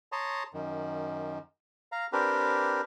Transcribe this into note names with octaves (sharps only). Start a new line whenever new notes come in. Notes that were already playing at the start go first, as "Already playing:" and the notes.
C#5 A5 A#5 C6 D#6
F#2 D#3
F5 A#5
C4 D4 G4 A#4 B4